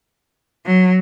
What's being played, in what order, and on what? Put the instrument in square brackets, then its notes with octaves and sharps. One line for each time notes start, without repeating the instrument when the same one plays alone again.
[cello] F#3